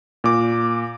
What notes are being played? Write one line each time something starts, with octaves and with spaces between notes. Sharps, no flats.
A#2 D6